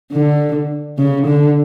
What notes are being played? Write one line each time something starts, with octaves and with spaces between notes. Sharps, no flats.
D3
C#3
D3